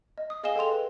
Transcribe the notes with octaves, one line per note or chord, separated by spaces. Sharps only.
D#5
D#6
G#4 D#5 F5 G#5 E7 G7
A4 D#5 G5 C6 F7
B4